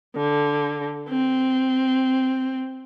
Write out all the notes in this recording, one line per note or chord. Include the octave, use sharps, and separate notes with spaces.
D3
C4